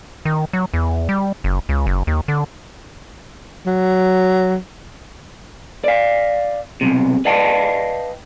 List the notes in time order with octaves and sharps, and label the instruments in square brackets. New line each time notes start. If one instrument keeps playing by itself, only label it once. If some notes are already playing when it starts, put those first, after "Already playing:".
[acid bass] D#3
F#3
E2
G3
F#1
C#2
F#1
D#2
D3
[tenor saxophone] F#3
[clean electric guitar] D5 F5
B1 F2 C3
B4 D5 D#5 F5 G5 A5